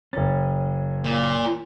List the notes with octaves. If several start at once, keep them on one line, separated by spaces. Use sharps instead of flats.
F#1 C#4 A6
A#2